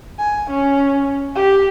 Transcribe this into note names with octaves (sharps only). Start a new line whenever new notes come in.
G#5
C#4
G4